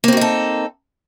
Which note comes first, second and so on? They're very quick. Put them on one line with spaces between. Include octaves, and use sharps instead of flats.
A#3 C4 F#4 D#4 A4